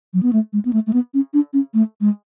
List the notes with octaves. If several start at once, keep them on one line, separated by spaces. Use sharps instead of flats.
F#3
B3
A3
G#3
B3
A3
A3
B3
C#4
D4
C#4
A3
G#3